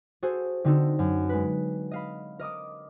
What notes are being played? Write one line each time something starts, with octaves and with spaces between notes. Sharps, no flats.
F#4 G#4 A4 C5
D3 C4 D#4 F#4 A4
F#2
G#3 B4
D#5 F5 B5
A#4 D#5 D6 D#6